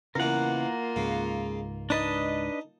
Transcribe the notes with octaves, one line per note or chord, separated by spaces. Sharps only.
E2 C#3 E3 A#3 F4 A#4 F#5
C#2 G#2 C#3
D4 D#4 B4 D#5 A5